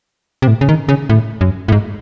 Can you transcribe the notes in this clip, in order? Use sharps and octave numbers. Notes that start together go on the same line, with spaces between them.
C3
A2
C#3
D#3
C#3
A2
F#2
A2
G#2